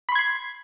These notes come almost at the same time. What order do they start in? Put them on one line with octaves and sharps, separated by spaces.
B5 C6 G#6 C7